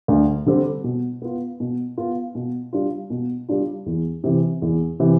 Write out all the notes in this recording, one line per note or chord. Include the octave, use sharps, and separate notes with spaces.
D2
D3 G3 C4 G4
B2
B3 F4
B2
B3 F4
B2
G3 D4 F4
B2
G3 D4 F4
E2
C3 E3
E2
C3 E3